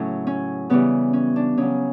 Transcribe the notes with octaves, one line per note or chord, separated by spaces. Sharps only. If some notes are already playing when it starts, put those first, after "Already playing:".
Already playing: A2 C#3 F#3 C#4 E4
C#4
C#3 E3 G3 B3
C#4
D4
C#3 F#3 C#4